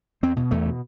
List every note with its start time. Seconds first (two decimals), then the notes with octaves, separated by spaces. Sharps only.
0.23 E2 C4
0.36 B2
0.51 E2 A3
0.66 B2